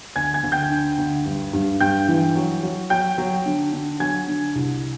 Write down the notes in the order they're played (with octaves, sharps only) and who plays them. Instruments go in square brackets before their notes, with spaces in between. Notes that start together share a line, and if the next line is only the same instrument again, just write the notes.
[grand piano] D2 G#5 G#6
G#5 G#6
D2
G5 G6
D3
D2
G2
G2
G2 G5 G6
E3
F#3
F#3
F#3 G5 G6
F#3
D3
D3
F#3 G#5 G#6
D3
C2